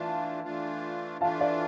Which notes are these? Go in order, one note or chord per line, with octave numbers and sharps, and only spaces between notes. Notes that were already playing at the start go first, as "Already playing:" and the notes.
Already playing: E3 A3 D4 F4 F5 A5
E3 A3 D4 F4
E3 A3 D4 F4 F5 A5
D5 F5